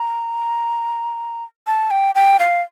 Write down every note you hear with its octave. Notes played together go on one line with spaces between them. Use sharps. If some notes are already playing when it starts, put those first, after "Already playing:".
Already playing: A#5
A5
G5
G5
F5